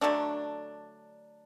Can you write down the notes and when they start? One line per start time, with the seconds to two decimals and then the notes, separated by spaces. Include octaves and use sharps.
0.01 D3 F#3 A3 D4